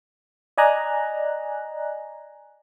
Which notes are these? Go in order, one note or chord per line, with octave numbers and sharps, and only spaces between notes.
D5 D#5 G#5 A#5 F#6